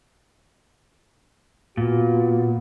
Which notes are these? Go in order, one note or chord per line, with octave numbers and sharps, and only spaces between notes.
A#2 B3 F4 F#4